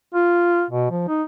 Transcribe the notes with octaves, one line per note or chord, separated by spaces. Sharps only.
F4
B2
F3
D#4